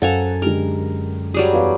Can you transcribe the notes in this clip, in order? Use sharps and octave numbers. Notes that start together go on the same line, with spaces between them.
F#2 A4 C5 F5 F#5 G#5 A#5
D3 G#3 G4 A#4
F#3 G3 G#4
E2 B4 F5